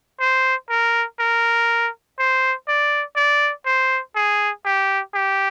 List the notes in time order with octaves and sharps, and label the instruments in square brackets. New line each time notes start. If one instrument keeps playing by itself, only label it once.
[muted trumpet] C5
A#4
A#4
C5
D5
D5
C5
G#4
G4
G4